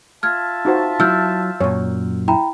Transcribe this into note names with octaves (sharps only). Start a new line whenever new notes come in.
F4 E5 A5 F6 G#6
D#4 F#4 C5
F#3 E4 E6 F6 G6
F#2 A#2 C#5
E4 G5 A#5 B5